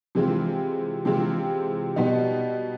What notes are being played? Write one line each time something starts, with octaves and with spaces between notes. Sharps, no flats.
C3 E3 G#3 C4 F4
C3 E3 G#3 C4 F4
B2 G3 B3 D#4